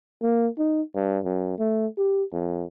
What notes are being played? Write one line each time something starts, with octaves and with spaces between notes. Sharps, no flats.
A#3
D#4
G2
F#2
A3
G4
F2